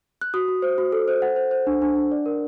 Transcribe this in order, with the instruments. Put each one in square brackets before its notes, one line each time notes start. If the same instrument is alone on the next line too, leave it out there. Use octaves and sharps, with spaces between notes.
[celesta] F#6
F#4 D#6
F#4
C5
F#4
A4
C5
C5 F#5
C5
C5
D4
D4
D4
D5
A#4